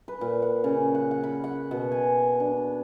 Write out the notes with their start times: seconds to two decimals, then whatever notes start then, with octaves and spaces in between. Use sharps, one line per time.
0.08 B4
0.21 A#2
0.42 F#5
0.64 C#3
0.95 F#5
1.11 F#5
1.23 B5
1.44 F#5
1.71 B2
1.91 G#5
2.40 D4